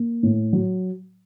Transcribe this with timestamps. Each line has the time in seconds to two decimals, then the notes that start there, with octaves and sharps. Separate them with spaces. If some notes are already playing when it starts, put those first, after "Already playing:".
Already playing: A#3
0.23 A2
0.53 F#3